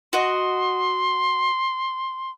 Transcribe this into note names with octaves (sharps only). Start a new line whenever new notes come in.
F#4 D#5 C6